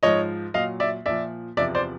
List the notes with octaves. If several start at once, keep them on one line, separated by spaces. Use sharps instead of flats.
G#2 F3 C#5 D#5
A#2 F#3 D#5 F5
D5 E5
A#2 F3 D5 E5
E2 C3 F3 D5 E5
C5 D5